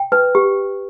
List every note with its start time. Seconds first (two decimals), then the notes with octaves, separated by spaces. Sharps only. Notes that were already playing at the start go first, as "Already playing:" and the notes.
Already playing: G5
0.12 B4
0.35 G4